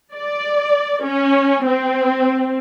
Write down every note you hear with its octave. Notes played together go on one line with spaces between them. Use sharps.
D5
C#4
C4